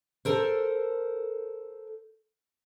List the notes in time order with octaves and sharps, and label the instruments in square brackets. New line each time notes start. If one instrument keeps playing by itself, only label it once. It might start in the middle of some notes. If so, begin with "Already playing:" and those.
[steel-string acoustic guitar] A4 A#4 C5